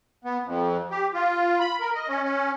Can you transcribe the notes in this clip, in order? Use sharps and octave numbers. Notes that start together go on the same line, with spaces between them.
B3
F2
G4
F4
B5
A#4
D#5
C#4
C#4